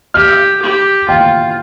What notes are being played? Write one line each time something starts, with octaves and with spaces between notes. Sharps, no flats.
G4 F6
G4
F4 G5